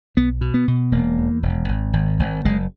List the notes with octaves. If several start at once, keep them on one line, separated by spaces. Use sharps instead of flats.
B1 B3
B2
B3
B2
E1 A#3
E2
E1
G#1
G#1
G#1
F#1 G#3